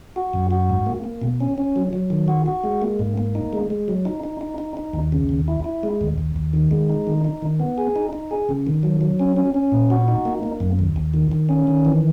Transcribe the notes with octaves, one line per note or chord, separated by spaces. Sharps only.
F#4
F#2
F#4
G#2
A#3
A#3
B2
C#4
C#4
F#3
F#3
D#3
F#4
F#4
G#3
A#3
G#2
A#3
D#4
G#3
G#3
F#3
D#4
D#4
D#4
D#4
D#4
D#2
C#3
D#2
E4
E4
G#3
D#2
D#2
D#2
D#3
G#3
D#4
D#3
D#4
D#3
B3
G#4
D#4
D#4
G#4
C#3
D#3
F#3
F#3
C#4
C#4
C#4
A#2
F#4
D#4
A#3
A#3
F#2
D#2
D#2
D#3
D#3
C#4
D#3
E3